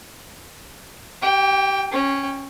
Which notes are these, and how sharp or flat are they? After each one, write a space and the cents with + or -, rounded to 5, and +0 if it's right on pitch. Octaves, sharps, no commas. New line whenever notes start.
G4 -25 G5 +20
C#4 -5 G5 +20